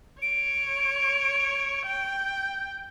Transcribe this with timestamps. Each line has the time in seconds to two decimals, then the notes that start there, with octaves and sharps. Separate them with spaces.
0.22 C#5 D7
1.86 G5